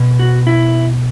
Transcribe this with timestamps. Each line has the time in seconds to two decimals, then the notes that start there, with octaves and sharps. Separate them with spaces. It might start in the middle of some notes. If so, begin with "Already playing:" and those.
Already playing: B2
0.19 F#4
0.47 E4